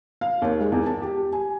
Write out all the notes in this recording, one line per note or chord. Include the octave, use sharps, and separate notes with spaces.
F5
D#2
G#3
E2
A5
G4
G#5